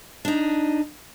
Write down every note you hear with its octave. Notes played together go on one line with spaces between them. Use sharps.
D4 D#4